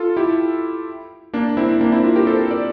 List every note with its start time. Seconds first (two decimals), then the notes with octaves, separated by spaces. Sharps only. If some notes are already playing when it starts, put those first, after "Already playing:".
Already playing: F4 A4
0.17 E4 G4
1.33 A#3 D4
1.57 C4 E4
1.81 A#3 D4
1.92 C4 E4
2.04 D4 F4
2.16 G4 A#4
2.27 A4 C5
2.51 A#4 D5